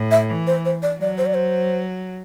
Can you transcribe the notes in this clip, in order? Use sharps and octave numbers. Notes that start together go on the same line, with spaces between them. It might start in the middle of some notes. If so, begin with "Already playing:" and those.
Already playing: A2
E5
E3
C5
C5
D5
F#3 D5
C5
D5
C5